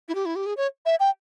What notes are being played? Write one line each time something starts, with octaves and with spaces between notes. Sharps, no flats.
E4
G4
E4
G4
G#4
C#5
E5
G5